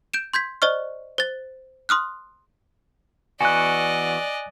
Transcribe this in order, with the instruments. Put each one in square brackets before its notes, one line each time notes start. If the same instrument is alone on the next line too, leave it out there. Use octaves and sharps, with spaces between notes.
[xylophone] G6 D7 E7
C6 G6 G#6 B6
C5 D5 D#5 C#6 F6
C5 A6
C6 D#6 F6 F#6
[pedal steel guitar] E3 B3 F#4 [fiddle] D5 D#5 [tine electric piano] G#5 F#6